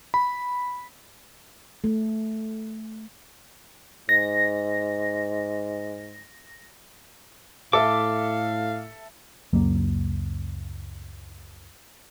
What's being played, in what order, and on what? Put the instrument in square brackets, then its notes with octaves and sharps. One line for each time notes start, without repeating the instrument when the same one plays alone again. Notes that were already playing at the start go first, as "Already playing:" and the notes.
[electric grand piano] B5
[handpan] A3
[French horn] G#2 [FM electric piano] A#6
[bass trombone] A2 [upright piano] A4 E5 [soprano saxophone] F5 [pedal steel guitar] D6
[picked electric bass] C#2 F#2 F#3 A#3